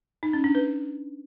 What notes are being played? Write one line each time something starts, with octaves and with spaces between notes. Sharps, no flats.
D#4
C#4
D4
B4